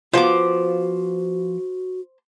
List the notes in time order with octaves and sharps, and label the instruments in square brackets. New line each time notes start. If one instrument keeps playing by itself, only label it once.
[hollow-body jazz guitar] F3 B3 F4 [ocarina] F#4 [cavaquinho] C5 D6